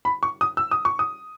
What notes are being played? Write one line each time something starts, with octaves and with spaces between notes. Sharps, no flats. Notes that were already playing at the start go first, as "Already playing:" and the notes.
B5
C#6
D#6
E6
D#6
C#6
D#6